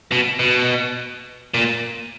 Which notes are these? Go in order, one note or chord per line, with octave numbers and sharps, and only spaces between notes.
B2
B2
A#2